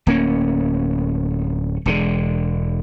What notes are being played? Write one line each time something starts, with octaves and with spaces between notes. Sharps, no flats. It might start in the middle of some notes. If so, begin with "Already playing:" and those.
D1 A#3 C#4
E1 D3 G#3